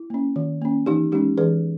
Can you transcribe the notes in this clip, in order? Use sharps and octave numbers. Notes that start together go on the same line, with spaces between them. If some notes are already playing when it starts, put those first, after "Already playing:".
Already playing: E4
A#3 C#4
D#3
A#3 C#4
E3 D#4 G4
G#3 C#4 D#4 G4
E3 G#4 B4